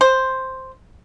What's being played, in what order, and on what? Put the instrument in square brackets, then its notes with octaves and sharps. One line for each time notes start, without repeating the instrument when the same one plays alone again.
[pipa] C5